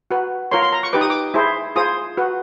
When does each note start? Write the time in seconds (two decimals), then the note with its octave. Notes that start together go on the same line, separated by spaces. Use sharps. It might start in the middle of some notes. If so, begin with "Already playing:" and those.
0.11 F#4 B4
0.51 F4 A#4 C#5 C6
0.63 C6
0.72 A#5
0.83 C#6
0.93 D#4 G4 B4 D6
1.01 D#6
1.10 D6
1.34 E4 G#4 C5
1.76 F4 G#4 C5 D#6
2.17 F#4 B4